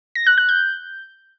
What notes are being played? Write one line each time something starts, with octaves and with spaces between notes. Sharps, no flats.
A#6
F#6
F#6
G6